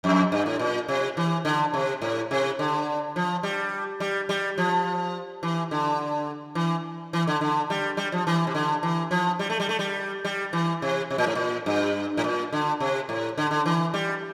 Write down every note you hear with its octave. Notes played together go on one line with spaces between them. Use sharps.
F2
G2
A2
A#2
C3
E3
D3
C3
A2
C3
D3
F3
G3
G3
G3
F3
E3
D3
E3
E3
D3
D3
G3
G3
F3
E3
C3
D3
E3
F3
G3
A3
G3
A3
G3
G3
E3
C3
C3
A#2
A2
A#2
G2
A2
A#2
D3
C3
A2
D3
D3
E3
G3